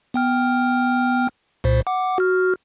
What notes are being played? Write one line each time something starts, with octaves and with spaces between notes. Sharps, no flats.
B3 G5 F6
C2 A#2 C5
F#5 D6
F#4 F6